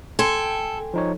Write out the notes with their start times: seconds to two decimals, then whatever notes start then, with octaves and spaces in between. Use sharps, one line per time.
0.19 A4 G5 G#5 C6
0.94 F3 D#4 C#5